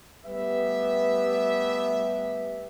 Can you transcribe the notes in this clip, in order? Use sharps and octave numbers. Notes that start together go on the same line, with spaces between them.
G3 A3 B3 G4 B4 E5